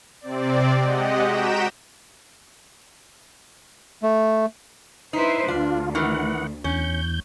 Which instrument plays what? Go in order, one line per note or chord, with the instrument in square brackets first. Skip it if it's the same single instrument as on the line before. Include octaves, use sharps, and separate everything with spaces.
[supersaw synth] C3 C4 D5
G#3 G4 D#5 F#5
F#4 A#5 G6 B6 D7 E7
[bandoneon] A3
[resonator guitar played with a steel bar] D#4 [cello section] E4 B4 C5
[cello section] D2 [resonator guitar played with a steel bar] D4 [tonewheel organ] F4
[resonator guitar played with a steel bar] D#3 E3 [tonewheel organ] F#5
[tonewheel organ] E2 G6 [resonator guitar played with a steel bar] C#4